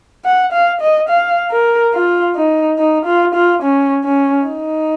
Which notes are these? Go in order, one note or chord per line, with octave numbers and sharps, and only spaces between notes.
F#5
F5
D#5
F5
A#4
F4
D#4
D#4
F4
F4
C#4
C#4
D#4